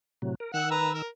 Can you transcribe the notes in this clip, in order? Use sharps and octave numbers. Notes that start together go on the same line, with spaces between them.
A2 C3 F#3
A#4
D#3 F#5 E6
B4 A#5
A#4